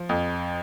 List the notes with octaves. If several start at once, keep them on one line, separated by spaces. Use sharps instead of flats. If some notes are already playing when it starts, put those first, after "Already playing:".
Already playing: F3
F2